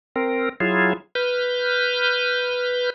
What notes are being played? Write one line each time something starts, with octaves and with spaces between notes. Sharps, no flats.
C4 A#4
F#3 E4 F4 G#4
B4 F6 G6